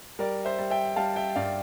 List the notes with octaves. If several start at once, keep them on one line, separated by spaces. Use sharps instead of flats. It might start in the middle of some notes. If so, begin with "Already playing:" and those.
G3 A#4 D5
C5 E5
G3
E5 G5
G3 F5 A5
E5 G5
G2 D5 F5